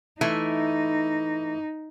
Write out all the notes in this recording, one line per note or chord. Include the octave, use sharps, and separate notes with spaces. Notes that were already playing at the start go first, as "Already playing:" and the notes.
E3 A3 D#4